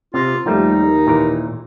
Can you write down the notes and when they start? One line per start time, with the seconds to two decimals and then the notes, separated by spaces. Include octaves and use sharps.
0.14 C3 F4
0.46 D#2 F3 G3 A3 D#4
1.07 A#2 E3 A#4